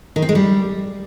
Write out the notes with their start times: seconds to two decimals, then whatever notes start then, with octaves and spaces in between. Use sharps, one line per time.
0.16 D#3
0.22 C4
0.29 G#3
0.35 G3